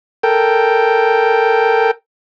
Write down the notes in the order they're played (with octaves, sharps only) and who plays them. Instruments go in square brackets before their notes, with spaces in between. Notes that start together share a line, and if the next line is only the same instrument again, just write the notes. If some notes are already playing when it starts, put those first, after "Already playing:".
[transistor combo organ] A4 A#4 G5